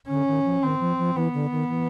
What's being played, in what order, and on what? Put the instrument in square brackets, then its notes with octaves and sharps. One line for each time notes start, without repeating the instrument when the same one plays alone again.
[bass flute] D3 [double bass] C#4
[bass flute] D#3
F3
[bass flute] D#3 [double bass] C4
[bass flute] F3
F3
[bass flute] E3 [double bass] B3
[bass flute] D3
D#3
E3